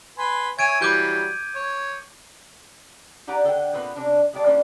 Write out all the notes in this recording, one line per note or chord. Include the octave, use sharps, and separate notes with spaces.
B4 G#5 C6
C#5 E5 G#5 G#6 D7 D#7
E3 F#3 G3 D6 G6 D7
C#5
D#4 G4 D5 F#5 G#5 A#5
D3 A4 F#5 G5
A#2 B3 C4 B4
C3 C#4 D4
G#3 E4 G4 A#4 D5 A5
E3 G3 A#3 C#4 D4 C5